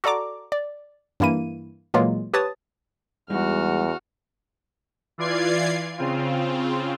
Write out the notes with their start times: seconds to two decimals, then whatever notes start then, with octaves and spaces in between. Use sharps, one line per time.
0.04 F#4 A4 D5 A#5 D6
0.52 D5
1.20 G2 E3 A#3 E4 D#7
1.94 A#2 E3 F#3 G#3 A#3 F4
2.34 G4 B4 C#5 A5 D#6 A6
3.30 E2 G3 G#3 D#4 F#4 F6
5.18 E3 F4 D5 G#6 C7
5.98 C#3 C4 F4